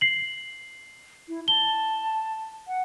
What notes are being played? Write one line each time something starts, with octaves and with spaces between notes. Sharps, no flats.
C7 F#7
E4
A5 G7
F#5